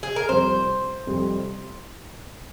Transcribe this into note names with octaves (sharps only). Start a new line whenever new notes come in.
G#4
A#4
F2 C3 G3 C5
F2 C3 G3